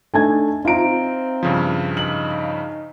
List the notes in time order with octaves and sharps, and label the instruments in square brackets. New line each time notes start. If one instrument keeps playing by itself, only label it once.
[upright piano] A3 D4 D#4 [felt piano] G#5 A5 G#6
[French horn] C4 [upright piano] D#4 D7 [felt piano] F4 E5 A#5
[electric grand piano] G2 C#3 F3
[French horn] D#4 [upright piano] F#7